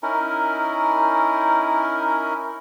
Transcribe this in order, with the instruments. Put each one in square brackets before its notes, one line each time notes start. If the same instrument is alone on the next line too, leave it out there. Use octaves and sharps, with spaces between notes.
[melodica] C#4 D#4 E4 A#4